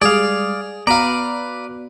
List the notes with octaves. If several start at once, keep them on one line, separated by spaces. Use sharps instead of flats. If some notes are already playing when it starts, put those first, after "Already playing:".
G3 G#3 G#4 D5 F5
B3 F#4 B4 D5 F5 A#5